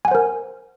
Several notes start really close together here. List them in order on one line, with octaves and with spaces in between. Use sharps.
G#5 F#5 C5 A#4